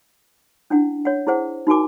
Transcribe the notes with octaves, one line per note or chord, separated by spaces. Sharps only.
C#4 D4 E4 F#5
C#5 F#5
E4 G#4 C5 F#5
D#4 F#4 A#4 G#5 D6